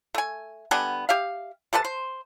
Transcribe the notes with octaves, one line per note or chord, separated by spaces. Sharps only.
A3 G#5
D3 G3 B3 G#5
G4 E5 F5
C3 A4 B4 A5
C5